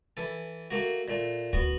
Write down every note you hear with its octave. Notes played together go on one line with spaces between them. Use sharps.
E3 A4
A3 A#3 F#4
A#2 A3
D1 B3 F#4